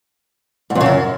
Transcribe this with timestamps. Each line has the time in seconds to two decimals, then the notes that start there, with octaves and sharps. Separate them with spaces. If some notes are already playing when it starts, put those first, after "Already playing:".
0.70 G#2
0.75 F2
0.81 C#3
0.86 F#2